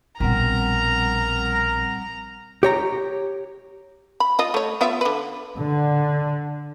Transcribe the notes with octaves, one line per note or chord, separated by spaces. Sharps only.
A#1 B2 G3 C4 A#4 F#5 A#5
G4 C#5 A#5
B5
F4 D#5
A3 C#5
B3 F4 E5
D3 B4
D3